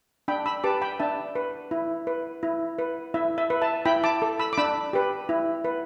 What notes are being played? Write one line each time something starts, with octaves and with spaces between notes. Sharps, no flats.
D4 G5 B5
B5 E6
G4 B4 A5 D6
G5 B5
D4 E5 A5
B4
E4
B4
E4
B4
E4 E5
E5
B4
E5 A5
E4 G5 B5
A5 D6
A4
B5 E6
D6
D4 B5 E6
G4 B4
E4
B4